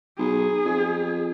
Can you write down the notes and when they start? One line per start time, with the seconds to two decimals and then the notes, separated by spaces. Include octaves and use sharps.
0.18 B1 G#4
0.65 F2